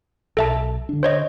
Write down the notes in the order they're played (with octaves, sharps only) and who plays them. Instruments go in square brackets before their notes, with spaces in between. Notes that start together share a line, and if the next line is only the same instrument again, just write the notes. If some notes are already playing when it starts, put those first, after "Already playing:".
[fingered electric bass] B1 [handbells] A4 E5 A5
[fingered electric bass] D3 D4
[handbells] C5 C#5 D#5